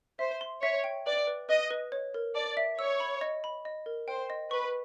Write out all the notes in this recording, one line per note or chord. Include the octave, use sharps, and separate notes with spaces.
C5 E5
C6
C#5 E5
G5
B4 D5
B4
B4 D#5
B4
C#5
A#4
D5 A5
E5
C#5 E6
B5
D#5
B5
D#5
A#4
C5 G5
D#5
B4 C#6